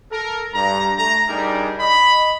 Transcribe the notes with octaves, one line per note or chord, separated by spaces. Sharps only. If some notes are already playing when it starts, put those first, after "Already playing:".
A4 A#4
G2 A#5
A3 A#5
G3 D4 D#4 G4 G#4 A#4
D#5 B5